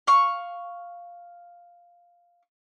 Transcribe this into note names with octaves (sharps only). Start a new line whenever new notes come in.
F5 C#6